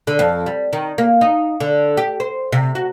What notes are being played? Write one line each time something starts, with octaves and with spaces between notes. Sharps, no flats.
D3
F2
G3
D#3
A#3
D#4
D3
G4
C5
C3
F#4